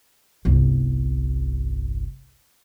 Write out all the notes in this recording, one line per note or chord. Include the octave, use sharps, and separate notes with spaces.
G1 C2